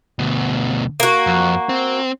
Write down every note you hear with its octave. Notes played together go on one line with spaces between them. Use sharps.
D2 B2
A#3 F#4
F2
C4